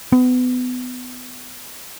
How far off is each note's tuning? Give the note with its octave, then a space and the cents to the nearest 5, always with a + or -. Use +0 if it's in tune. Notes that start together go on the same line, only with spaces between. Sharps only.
B3 +25